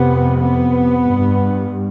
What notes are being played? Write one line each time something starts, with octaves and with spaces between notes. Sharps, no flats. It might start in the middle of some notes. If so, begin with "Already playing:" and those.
Already playing: F2 C3 B3
B3
G2